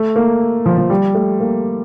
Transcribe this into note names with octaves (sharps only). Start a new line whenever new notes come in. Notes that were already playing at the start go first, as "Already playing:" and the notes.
Already playing: A3
A#3
F3
F3
G3
A3
A#3